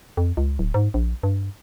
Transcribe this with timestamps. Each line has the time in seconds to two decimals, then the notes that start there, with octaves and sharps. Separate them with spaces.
0.17 F2
0.37 C#2
0.59 D1
0.74 G#2
0.94 A#1
1.23 G2